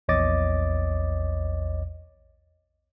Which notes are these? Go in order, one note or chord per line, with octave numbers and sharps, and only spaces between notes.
A#1 E2 C#5 D#5 D6 A6